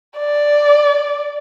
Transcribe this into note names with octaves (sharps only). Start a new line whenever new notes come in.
D5